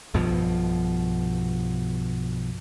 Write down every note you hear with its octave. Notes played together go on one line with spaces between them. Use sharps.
B1 G2 B2 F3